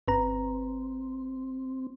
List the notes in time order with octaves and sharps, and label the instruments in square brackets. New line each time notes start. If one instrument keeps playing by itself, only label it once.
[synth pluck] G1 B4 A#5 [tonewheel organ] C4